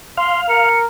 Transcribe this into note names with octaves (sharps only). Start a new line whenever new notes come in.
F5 C6
A#4 C#7